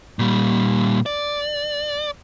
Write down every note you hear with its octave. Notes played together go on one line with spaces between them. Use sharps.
A#2 G3
D5